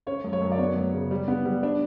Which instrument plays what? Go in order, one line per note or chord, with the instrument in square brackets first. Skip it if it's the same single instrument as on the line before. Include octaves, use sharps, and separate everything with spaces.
[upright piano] C#4 C#5
F#2
C#5
F#2
D5
B3 C#5
F#2
C#3
G3
B3
G3
D4